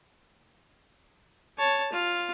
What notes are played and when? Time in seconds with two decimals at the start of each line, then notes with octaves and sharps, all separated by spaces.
1.58 C#5 A5
1.92 F4